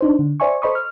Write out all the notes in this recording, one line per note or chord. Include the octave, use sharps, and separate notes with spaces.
D4 D#4 C5
D3
C5 D5 E5 G#5 C#6
A4 C5 D#5 B5 C#6 D#6
F6